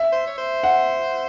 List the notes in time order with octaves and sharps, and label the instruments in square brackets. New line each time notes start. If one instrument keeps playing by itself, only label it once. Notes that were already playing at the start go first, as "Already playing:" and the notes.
Already playing: [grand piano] E5
[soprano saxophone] C5
C#5
C5
[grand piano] F#5